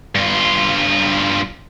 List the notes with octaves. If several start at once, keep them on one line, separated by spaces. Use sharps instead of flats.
G2 F4